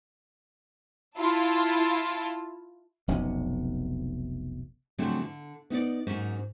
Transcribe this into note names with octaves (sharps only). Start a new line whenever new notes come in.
E4 F4 A5
F1 B1 C3 C#4
C#3 F3 F#3 A3 C4 D4
D3
B3 D#4 B4 D5
G#2 F#3 A#3 C#4 D#4